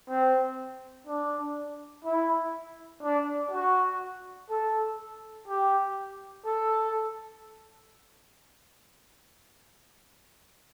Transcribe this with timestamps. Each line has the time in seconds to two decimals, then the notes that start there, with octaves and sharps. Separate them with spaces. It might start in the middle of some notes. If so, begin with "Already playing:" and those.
0.09 C4
1.07 D4
2.05 E4
3.02 D4
3.51 F#4
4.50 A4
5.48 G4
6.45 A4